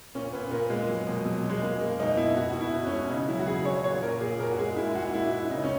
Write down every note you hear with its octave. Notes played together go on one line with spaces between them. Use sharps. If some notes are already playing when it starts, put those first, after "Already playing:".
A#2 C#4
A#2 B3
A#2 A#3
A#2 G#3
F#3
B2
F#3
F#3
G#3
G#3 A#3
G#3 A#3
B2 D#4
B2 E4
B2 F#4
F#4
B2
E4
B2
C#4
G#3
C#3 D#4
F#3 E4
F#4
C#3 G#4
F#3 C#5
A#2 C#5
A#2 A#4
A#2 G#4
A#2 A#4
F#4
G#3 G#4
G#3 E4
G#3 F#4
A#2 E4
G#3 E4
C#3 D#4
C#4